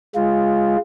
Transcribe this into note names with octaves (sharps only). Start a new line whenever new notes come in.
G#3 F4